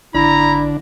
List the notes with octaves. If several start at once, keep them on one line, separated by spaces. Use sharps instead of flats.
G#1 D3 D4 E4 A#5